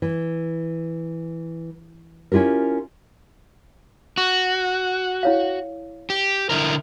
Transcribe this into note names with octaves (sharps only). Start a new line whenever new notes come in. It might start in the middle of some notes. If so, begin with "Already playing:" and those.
E3
C#4 E4 F4 G4 A#4
F#4 C#6
E4 C#5 F5
G4
D3 E4 A#4